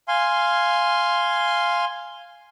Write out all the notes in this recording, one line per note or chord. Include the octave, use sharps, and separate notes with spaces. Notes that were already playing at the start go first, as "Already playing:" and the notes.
F5 G#5 C6